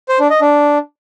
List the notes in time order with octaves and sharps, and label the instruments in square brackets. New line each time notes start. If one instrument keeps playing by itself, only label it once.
[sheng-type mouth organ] C5
D4
D#5
D4